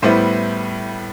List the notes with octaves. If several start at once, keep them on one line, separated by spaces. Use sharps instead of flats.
A2 G3 B3 E4 C5